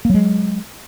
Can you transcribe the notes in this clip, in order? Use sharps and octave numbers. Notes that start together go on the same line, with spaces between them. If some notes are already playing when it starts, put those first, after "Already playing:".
F#3 G#3 A#3